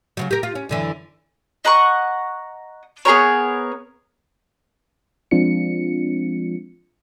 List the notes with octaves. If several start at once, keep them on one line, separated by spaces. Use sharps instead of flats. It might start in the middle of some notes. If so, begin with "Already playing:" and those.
C#3 F3 F#3
G4 A#4
F4
C#4
F#2 D3 E3
D#5 F#5 A#5 C#6
B3 G#4 A#4 C#5
F3 G#3 C4 D4 F4 C#7